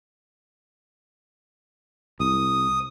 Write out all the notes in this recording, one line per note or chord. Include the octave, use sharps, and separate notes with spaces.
C2 D#6